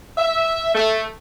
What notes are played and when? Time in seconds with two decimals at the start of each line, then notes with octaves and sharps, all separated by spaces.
0.17 E5
0.75 A3